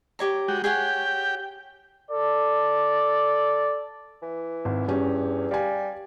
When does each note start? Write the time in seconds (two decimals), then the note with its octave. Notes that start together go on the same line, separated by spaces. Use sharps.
0.19 G4 C#5 A#5
0.48 G#3 F#4 G5
0.64 G4 G#4 C#5 F#5 G5
2.11 A4 D5
4.22 E3
4.65 G#1
4.88 E2 G2 C#4 G4
5.51 G3 F5 G#5